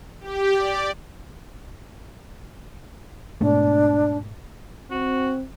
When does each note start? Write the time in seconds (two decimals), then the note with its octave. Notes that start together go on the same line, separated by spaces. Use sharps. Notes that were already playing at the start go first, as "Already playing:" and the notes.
0.20 G4
0.54 D5
3.41 G#2 B2 A3 D4
4.91 C4 F#4